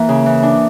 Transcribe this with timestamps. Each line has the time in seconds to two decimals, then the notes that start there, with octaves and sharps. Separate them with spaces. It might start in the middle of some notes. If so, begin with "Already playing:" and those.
Already playing: E3 A#3
0.09 C#3
0.26 E3
0.43 D4